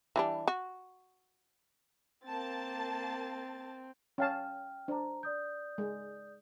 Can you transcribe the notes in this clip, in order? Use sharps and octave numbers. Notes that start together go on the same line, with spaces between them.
E3 G3 D4
F#4
A#3 C4 A5 A6
C#4 F5 G5 A5 F6
D4 C5 A#5
D5 D#6 G6
G#3